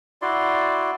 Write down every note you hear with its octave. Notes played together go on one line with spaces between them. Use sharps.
E4 F#4 D5 C6